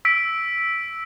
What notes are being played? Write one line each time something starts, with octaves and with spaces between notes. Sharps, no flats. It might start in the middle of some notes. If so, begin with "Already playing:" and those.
E6 B6 D7